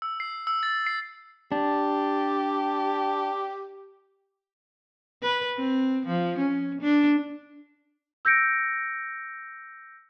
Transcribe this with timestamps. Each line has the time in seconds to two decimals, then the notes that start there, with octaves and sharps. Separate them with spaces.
0.02 E6
0.20 C7
0.47 E6
0.63 A6
0.86 C7
1.52 D4 G4
5.22 B4
5.57 C4
6.06 F3
6.38 C#4
6.81 D4
8.25 E6 G6 A#6 C#7 D7